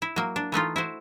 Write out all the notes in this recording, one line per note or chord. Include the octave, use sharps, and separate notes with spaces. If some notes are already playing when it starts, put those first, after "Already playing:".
E4
F#3 A#3
D4
E3 A3 D#4 F4
E4 F#4 C5